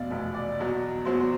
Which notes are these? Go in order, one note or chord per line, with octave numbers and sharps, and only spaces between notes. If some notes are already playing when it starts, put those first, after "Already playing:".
Already playing: F1 E2 B2 D5 F5
F1 E2 B2
D5
E2 B2 F#3
E2 B2 F#3 C5
C5